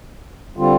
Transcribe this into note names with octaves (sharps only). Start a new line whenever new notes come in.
D3 G3 C4 F4